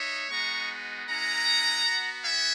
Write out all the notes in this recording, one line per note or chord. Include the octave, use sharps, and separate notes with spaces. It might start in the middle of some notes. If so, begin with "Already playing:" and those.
Already playing: B3 D#4 C#5 E5
G#3 B3 D#4 F#4 A#5 C#6
G#3 C#4 E4 F#5 A#5
B3 F#4
E5 G#5